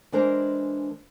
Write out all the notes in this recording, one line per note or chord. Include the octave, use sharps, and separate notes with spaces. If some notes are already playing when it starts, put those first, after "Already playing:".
E3 G#3 D4 A#4 C5